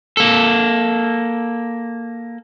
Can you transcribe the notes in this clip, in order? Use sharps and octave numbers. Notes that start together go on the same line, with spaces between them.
A#3 A4